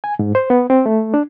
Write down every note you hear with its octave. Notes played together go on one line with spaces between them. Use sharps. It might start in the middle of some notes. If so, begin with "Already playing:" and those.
G#5
G#2
C5
B3
C4
A3
D4